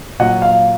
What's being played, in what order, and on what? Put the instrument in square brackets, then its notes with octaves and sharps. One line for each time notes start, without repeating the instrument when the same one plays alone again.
[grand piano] A#2 F#3 D#5 F#5
F5